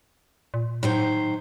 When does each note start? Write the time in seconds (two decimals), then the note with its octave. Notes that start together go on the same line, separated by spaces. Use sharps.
0.54 A#2
0.83 A2 D#3 F#3 C5